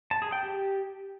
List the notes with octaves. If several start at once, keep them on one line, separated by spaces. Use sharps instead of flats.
A5
G#4
G5
G4